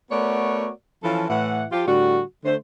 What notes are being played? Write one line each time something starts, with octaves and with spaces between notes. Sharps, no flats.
A3 B3 F#4 A#4 C#5 D5
E3 F3 C#4 A4 F5
A2 E3 F#5
F3 F4 G4
A2 D3 G3 F#4
D3 A3 C5